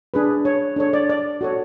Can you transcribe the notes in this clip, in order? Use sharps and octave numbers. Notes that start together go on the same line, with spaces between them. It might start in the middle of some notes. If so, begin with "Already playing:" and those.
D4 G#4 B4
C#5
D4 A4 C#5
D5
D5
F#4 A4 C#5